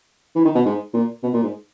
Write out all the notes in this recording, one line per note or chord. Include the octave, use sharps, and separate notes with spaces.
E3
D#3
B2
G#2
A#2
B2
A#2
G#2